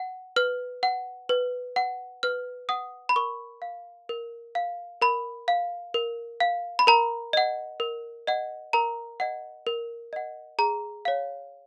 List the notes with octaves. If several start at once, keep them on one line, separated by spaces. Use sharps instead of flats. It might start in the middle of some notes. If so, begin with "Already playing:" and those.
Already playing: F#5
B4 F6
F#5
B4
F#5
B4 F6
F#5 D#6
B5
A#4 C#6
F5
A#4
F5
A#4 B5
F5
A#4
F5
B5
A#4 A#5
D#5 F#5
A#4
D#5 F#5
A#4 A#5
D#5 F#5
A#4
D#5 F#5
G#4 A#5
C#5 F5